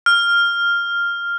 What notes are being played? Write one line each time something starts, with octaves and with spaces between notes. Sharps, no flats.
F6